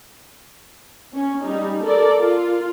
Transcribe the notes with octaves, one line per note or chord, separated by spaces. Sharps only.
C#4
G3 D#4
A4 A#4 D5
F4